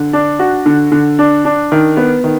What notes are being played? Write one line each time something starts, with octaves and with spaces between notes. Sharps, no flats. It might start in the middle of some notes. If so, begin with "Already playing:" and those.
Already playing: D3
D4
F#4
D3
D3
D4
D4
D#3
B3
D#3